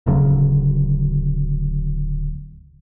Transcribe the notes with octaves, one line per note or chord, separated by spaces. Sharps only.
D1 D2 C#3 F#3